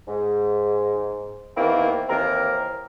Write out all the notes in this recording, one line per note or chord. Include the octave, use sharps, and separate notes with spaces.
G#2
E2 D#3 E3 A#3 C4 E4
D#2 C3 E3 A#3 C4 A#4